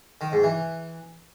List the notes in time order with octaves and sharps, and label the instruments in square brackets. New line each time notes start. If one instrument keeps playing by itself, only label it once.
[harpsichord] D#3
G#2
E3